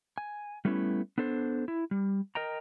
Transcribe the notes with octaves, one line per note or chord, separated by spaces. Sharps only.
G#5
G3 A3 B3 C#4 E4
B3 D4 A4 C5
E4
G3
A#4 D#5 G5 A#5